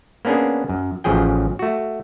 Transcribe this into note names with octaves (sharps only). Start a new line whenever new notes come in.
A#3 B3 C#4 D4 G#4
F#2
A1 C#3 F3 F#3 G#4 G5
A3 F#4